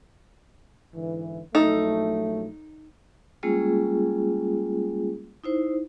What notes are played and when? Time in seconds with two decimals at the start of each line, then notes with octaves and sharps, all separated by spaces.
0.93 G#2 D3 E3
1.55 A#1 F#3 A3 D#4 A4
3.43 G3 G#3 A#3 C#4 F4 G#4
5.44 D#4 E4 C5